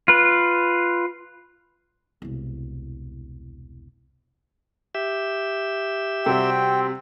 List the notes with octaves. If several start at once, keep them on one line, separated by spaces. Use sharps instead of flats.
F4 B4
E1 C2
G4 E5
C3 G3 C4 F#4 G5